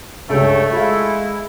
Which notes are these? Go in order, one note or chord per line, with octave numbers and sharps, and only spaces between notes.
C#2 G2 A3 C#5 G5
G#3 E4 F4 F5